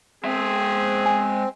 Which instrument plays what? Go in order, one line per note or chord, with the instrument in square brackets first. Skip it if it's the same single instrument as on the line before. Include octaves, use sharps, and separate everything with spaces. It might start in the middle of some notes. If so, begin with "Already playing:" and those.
[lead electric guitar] G#3 E5 [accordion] C4 [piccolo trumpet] G#4
[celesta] G#5